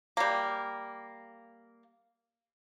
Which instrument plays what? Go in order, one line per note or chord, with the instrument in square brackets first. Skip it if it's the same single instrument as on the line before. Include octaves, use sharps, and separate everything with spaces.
[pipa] G3 A#3